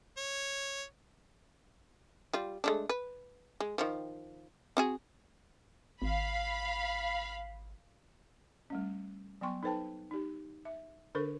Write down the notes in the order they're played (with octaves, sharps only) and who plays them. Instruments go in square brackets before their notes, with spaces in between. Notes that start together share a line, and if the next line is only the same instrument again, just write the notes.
[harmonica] C#5
[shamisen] G3 F4
G#3 A3 D4
B4
G#3
D#3 F3
C4 F#4 G#4
[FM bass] G#1 [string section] F5 B5
[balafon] G3 A3 C#4
F#3 B3 G5 C6 C#6
D#4 A4 B4 C5 G5 A5
D#4 G4
E5
D3 D4 A4 A#4 C5 C#6